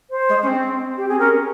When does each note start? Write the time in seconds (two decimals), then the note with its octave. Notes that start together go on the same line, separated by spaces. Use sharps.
0.10 C5
0.29 G#3
0.43 C#4
0.47 C4
0.97 G4
1.09 C4 G#4
1.19 C#4 A#4